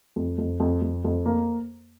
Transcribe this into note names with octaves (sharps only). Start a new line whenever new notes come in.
F2
F2
F2
F2
F2
A#3